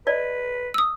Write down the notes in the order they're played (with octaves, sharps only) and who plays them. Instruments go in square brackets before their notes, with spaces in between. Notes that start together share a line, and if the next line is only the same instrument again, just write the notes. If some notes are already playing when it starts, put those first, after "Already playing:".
[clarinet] B4 [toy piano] D5 D#5
[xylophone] D#6 E6